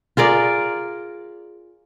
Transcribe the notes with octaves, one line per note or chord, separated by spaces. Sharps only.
F4 G#4 A#4 D5